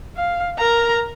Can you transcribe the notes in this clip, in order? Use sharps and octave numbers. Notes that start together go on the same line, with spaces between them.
F5
A#4 A#5